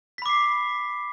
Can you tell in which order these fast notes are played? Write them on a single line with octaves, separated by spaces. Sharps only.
B6 B5 D6 C7